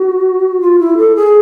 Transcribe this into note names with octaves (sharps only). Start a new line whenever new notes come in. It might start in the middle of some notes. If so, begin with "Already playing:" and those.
Already playing: F#4
F4
E4
A4
G#4